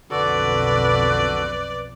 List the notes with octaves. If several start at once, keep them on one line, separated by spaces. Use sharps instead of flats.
B1 F2 D3 F#4 A4 B4 D5